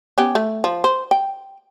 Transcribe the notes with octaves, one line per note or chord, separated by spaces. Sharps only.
B3 C#4 G4
A3
F3
C5
G5